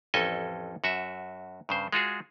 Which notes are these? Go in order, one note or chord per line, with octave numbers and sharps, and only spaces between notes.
A1 F2 C#4 A4 D#5 G#5
F#2 F#4 E5
G2 C#3 C5
G#3 F4 F#4 G#4